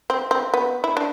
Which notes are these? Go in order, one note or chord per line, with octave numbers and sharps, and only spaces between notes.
C4
C4
B3
E4
D4